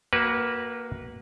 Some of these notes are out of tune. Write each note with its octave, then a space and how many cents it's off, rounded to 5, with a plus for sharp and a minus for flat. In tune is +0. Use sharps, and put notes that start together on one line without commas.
A#3 +0 F#4 +25 B4 -20